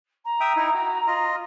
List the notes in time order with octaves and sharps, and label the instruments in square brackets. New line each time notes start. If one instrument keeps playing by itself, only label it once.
[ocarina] A#5
[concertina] E5 G5 D#6
D#4 E4
F#4
F4 D#5